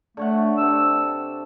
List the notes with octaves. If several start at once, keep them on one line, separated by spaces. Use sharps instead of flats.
D3 A3 C#5 F#5
C3 D4 A4 E6